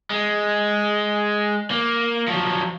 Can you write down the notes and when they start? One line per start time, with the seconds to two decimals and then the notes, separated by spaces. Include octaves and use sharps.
0.10 G#3
1.70 A#3
2.28 F3 F#3